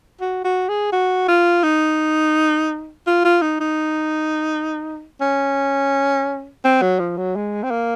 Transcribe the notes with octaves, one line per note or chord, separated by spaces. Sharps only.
F#4
F#4
G#4
F#4
F4
D#4
F4
F4
D#4
D#4
C#4
C4
F#3
F3
F#3
G#3
C4
A#3